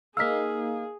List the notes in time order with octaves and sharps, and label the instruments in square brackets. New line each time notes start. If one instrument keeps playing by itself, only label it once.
[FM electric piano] A#3 D#4 F5 [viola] G#4 [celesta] E6 F6 B6